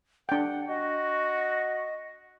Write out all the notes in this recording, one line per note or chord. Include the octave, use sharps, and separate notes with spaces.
D4 F#5 G5
F#4 D#5